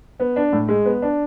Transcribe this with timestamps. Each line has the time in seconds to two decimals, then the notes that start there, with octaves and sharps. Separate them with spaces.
0.20 B3
0.36 D4
0.53 A2
0.68 G#3
0.85 B3
1.02 D4